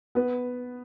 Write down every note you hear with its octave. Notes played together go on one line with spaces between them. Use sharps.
B3 B4